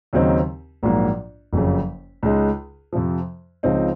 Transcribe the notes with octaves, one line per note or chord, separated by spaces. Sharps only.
D#2 C#3 F#3 C4 D#4
A#1 G#2 F#3 A#3
F#1 F2 C#3
C#2 C#3 G#3 D#4
F2 C3 F3
C#2 C#3 F3 C4 D#4